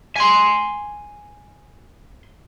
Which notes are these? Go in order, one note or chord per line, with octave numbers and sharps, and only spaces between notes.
G#5 C6